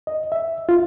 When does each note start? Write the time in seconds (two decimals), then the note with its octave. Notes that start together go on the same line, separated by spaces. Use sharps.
0.07 D#5
0.32 E5
0.69 F4